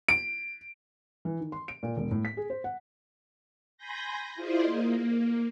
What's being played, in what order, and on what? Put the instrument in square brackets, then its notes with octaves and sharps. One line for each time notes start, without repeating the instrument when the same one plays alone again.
[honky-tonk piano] D7
[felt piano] E3
D#3
C6
D7
A#2
E1
A2
B6
G#4
C5
F#5
[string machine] G#5 B5 C6 G6 A#6
E4 F4 G#4 C5 D5 D#5
A#3